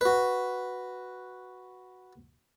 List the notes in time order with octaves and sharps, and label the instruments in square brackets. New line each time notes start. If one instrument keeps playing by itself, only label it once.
[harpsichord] F#4 B4